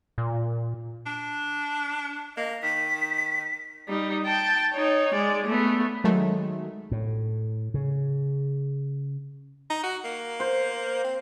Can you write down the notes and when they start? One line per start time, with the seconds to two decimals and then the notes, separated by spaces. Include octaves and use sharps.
0.18 A#2
1.06 D4
2.37 A#3 D#5
2.62 D#3 B6
3.88 G3 D#4
4.26 G5 A5
4.73 D#4 C#5
5.14 G#3 D5
5.46 A3 B3
6.04 D#3 F#3 G#3 A3
6.91 A2
7.74 C#3
9.70 D#4
9.83 F#4
10.04 A#3
10.40 C5
11.04 C4